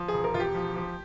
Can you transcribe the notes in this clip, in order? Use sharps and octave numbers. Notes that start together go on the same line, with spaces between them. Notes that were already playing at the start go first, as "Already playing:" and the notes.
Already playing: F3
G#4
E1
A#4
E1 F4
G4
F3
F3